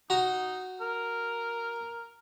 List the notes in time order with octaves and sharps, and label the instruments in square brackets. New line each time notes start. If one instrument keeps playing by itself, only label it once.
[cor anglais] D#4 [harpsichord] F#4 A#5
[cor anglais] A#4